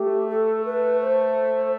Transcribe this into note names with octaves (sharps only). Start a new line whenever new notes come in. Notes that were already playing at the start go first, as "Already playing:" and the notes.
Already playing: A3 G4
A4
B4
C5